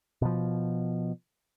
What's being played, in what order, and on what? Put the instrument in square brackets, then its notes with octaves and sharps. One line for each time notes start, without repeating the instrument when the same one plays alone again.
[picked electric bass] B2 F3